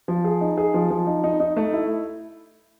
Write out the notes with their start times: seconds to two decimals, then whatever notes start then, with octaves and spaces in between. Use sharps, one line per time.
0.08 F3
0.24 G#4
0.41 D#4
0.57 G#4
0.74 F3
0.90 F3
1.07 D#4
1.24 D#4
1.40 D#4
1.57 A3
1.73 E4